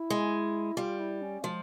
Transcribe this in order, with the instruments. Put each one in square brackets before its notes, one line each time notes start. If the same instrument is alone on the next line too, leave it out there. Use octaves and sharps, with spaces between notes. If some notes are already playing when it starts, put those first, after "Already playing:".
Already playing: [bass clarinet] E4
[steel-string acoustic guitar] G#3
[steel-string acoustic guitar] G3 [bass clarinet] F4
[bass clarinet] E4
C#4
[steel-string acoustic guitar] F3 [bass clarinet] G#3